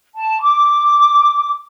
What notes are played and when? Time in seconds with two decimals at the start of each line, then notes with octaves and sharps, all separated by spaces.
0.15 A5
0.41 D6